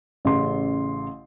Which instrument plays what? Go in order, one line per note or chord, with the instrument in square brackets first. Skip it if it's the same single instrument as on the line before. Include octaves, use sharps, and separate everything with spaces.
[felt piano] A1 C#3 C6